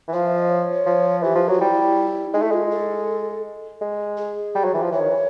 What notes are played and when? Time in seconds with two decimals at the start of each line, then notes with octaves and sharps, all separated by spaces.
0.08 E3
0.14 F3 F5
0.26 E5
0.38 D#5
0.50 C#5
0.86 F3
1.23 E3 G4
1.35 F3
1.49 F#3
1.60 G3 E4
2.34 G#3 D#4
2.42 A3 E4
2.51 G#3 F4
2.71 A4
3.81 G#3
4.18 G#4
4.55 G3
4.65 F#3
4.74 E3
4.82 F3
4.92 E3 C#5
5.00 D#3
5.10 E3